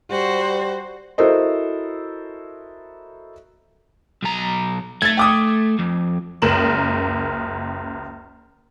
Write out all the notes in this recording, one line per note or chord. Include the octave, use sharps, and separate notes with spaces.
G3 F#4 C5
E4 F#4 A4 A#4 C5 D#5
B1 A#5
A3 G#6 A6
G5 D6 D#6
F2
F#1 C#2 A#4 E7 F#7